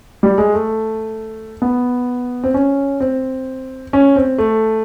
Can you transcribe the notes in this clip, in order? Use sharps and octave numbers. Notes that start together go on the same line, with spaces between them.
G3
G#3
A3
B3
C4
C#4
C4
C#4
C4
A3